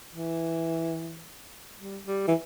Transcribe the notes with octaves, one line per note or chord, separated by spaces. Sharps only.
E3
G3
G3
E3